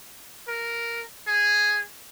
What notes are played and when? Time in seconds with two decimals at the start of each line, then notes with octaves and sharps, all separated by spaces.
0.48 A#4
1.27 G#4